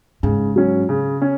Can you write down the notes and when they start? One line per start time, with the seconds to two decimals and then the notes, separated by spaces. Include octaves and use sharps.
0.23 G#2 C#3
0.56 F#3 C#4
0.89 C#3
1.22 C#4